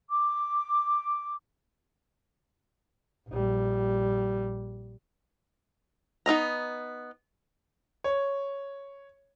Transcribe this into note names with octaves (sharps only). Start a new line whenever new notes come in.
D6
A#1 G3
B3 D#4 D#5 A#5
C#5